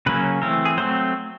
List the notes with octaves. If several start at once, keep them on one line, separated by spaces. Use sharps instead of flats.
C#3 F#3 A#3 C#4 B4
E3 A3 C4 A#4
G#4
F#3 A3 C4 C5